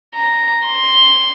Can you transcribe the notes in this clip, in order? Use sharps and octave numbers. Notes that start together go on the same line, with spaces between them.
A#5
C6